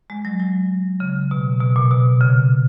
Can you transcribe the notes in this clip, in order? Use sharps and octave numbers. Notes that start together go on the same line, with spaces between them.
G#3
F#3
F#3
C#3
B2
B2
A#2
B2
C#3